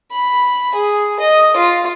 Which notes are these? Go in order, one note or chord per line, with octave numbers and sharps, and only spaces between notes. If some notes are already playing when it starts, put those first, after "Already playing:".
B5
G#4
D#5
F4